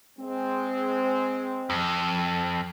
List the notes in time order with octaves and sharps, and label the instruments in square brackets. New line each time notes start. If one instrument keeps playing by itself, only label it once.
[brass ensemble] G#3 C4
[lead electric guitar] F2